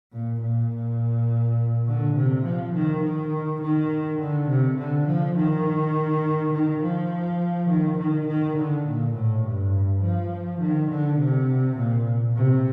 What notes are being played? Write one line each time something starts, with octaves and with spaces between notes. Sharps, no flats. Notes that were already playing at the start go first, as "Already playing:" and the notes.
A#2
A#2
D3
C3
F3
D#3
D#3
D#3
D3
C3
D3
F3
D#3
D#3
F3
D#3
D#3
D#3
D3
A#2
A2
G2
F3
D#3
D3
C3
A#2
C3